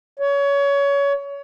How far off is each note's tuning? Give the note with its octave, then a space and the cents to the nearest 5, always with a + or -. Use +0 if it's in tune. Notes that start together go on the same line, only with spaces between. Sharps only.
C#5 +25